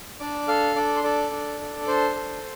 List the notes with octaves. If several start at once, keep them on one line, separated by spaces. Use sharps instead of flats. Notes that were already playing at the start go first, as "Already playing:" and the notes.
D4 D5 D6
A4 F5 F6
D4 D5 D6
C6
A4 D5 D6
D4
A4
D4 C5 C6
A4